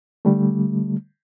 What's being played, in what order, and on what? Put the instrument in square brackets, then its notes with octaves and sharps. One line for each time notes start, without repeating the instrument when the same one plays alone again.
[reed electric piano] D3 G3 A3